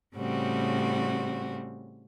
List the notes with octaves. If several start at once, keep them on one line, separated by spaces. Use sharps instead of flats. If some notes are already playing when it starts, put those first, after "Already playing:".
A2 C#3 G3 C4 F#4